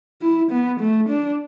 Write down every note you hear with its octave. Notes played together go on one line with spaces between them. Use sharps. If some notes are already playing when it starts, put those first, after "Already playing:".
E4
B3
A3
D4